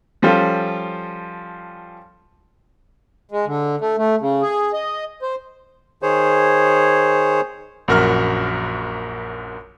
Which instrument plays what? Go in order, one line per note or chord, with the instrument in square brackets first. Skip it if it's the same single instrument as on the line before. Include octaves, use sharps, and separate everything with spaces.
[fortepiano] F3 G3 C#4 F4 A4
[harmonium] G#3
D3
A3
A3
C#3
G#4
D#5
C5
[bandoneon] D#3 G#4 C5 C#5
[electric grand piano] A#1 F#2 F#4 A#4 C#6 F6